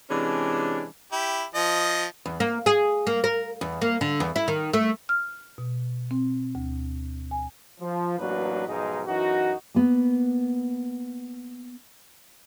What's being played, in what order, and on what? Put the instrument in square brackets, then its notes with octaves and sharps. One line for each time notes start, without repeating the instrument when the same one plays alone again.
[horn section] C3 E3 G#3 C#4 D4
[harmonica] E4 G4
F3 D#5
[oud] E2
A#3
G#4
A#3
A#4
E2
A#3
D3
E2
E4
D#3
A3
[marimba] F6
B2
C4
D2
G#5
[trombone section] F3
A1 F#3 A#3 D4 F#4 B4
B1 G#2 F3 G#3 D#4
F#2 E3 D#4 F#4
[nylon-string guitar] A#3 B3